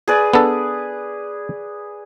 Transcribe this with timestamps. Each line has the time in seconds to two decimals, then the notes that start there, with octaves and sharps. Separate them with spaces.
0.08 G#4 B4 D5
0.33 B3 D4 A4